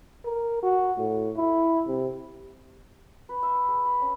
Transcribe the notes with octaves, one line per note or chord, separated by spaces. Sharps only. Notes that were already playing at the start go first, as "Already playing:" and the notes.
A#4
F#4
A2
E4
C3
B4
E5
C#6
G#4
B5
C#4